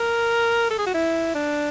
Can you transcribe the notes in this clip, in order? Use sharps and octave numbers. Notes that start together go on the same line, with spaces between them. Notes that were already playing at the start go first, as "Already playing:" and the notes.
Already playing: A#4
A4
G#4
F#4
E4
D4